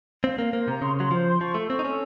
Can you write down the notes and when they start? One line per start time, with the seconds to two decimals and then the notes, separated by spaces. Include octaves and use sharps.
0.24 C4 F5
0.38 A#3 F5
0.53 A#3 C5
0.68 C3 A#5
0.82 C#3 C6
0.96 F#3 C6
1.11 F3 C5
1.26 C6
1.41 F3 C#6
1.54 A3 A4
1.70 C4 C#6
1.79 D#4
1.84 C#4 A4